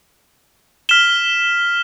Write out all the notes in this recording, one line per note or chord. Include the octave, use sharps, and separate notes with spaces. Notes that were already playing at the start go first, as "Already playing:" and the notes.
F6 B6 E7 G7